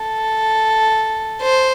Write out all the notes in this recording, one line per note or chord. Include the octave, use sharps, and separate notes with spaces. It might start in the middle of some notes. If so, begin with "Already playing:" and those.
Already playing: A4
C5